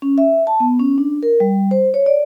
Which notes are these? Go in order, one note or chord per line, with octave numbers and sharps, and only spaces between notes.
C#4
E5
A5
B3
C#4
D4
A#4
G3
C5
C#5
D5